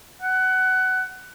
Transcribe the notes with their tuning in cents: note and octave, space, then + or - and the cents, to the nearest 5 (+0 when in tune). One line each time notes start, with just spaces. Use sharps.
F#5 +20